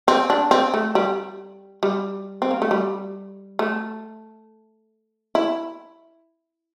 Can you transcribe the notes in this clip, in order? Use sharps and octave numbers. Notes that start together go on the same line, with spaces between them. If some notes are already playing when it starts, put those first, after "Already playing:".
C4
D4
C4
A3
G3
G3
C4
A#3
A3
G3
A3
E4